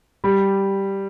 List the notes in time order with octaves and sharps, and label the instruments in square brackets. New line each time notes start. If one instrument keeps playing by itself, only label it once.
[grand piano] G3